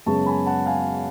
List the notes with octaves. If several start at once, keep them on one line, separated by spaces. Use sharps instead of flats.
F#2 C#3 G#3 B3 A5 C#6
G#5 B5
F#5 A5
F5 G#5